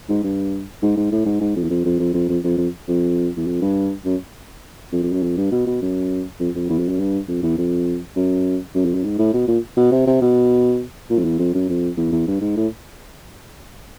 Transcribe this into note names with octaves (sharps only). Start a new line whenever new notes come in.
G#2
G2
G#2
G#2
A2
G#2
G#2
F2
E2
F2
F2
F2
F2
F2
F2
F2
F2
E2
F2
G2
F#2
F2
F2
F#2
F2
G2
B2
B2
F#2
F2
F2
E2
F2
F#2
G2
F2
E2
F2
F#2
F#2
F2
F#2
G#2
A2
B2
A#2
B2
C3
C3
B2
A#2
F2
E2
F2
F#2
F2
E2
E2
G2
G#2
A2